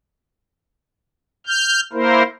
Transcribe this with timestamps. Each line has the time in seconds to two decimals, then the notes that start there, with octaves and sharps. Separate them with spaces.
1.47 F6 G6
1.93 A#3 E4 A#4 C5